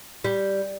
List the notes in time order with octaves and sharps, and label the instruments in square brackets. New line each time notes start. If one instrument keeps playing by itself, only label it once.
[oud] G3